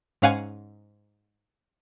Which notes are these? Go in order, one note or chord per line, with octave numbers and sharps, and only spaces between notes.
G#2 C#4 F5 F#5 G#5